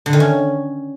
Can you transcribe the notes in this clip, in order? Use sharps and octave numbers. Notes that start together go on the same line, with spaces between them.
D3
D#3
C#4